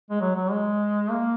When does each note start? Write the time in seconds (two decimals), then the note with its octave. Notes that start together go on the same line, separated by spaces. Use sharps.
0.11 G#3
0.21 F#3
0.36 F#3
0.51 G#3
1.11 A#3